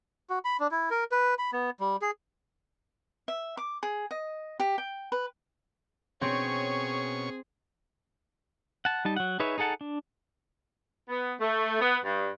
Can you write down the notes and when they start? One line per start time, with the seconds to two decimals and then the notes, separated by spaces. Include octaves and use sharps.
0.30 F#4
0.45 B5
0.60 D4
0.71 E4
0.91 A#4
1.12 B4
1.38 B5
1.53 B3
1.80 G3
2.02 G#4
3.28 E5
3.57 D6
3.83 G#4
4.11 D#5
4.60 G4
4.78 G5
5.12 B4
6.22 B2 C4 C#4 G#4 C#5 C#6
8.85 F#5 A5
9.05 G3 D#4 A5
9.16 F#3 F#5
9.40 D#4 G#4 B4 C#5 E5
9.58 D#4 G#4 A4 F#5 A5
9.81 D4
11.09 B3
11.40 A3
11.81 B3
12.04 G2